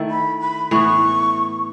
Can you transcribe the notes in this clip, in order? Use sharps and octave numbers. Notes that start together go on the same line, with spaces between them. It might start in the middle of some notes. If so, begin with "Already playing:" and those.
Already playing: D#3 A3 E4 A4
B5
B5
A2 E3 B3 C#6